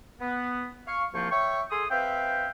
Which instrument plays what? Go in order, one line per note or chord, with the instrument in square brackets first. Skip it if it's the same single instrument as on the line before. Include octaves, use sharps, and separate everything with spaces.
[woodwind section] B3
F5 C#6
C2 F3 A#3 F4 G5 C#6
C#5 E5 G5 C#6
G#4 A4 G#5 C6 D#6
C4 B4 E5 F5 G5